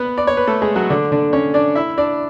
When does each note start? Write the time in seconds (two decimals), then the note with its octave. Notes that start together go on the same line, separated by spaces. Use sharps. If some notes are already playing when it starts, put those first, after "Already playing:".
Already playing: B3 B4
0.18 D5
0.27 C#5
0.37 B4
0.47 A3 A4
0.62 G#3 G#4
0.76 F#3 F#4
0.90 D3 D4
1.12 D3 D4
1.33 C#4 C#5
1.54 D4 D5
1.75 E4 E5
1.98 D4 D5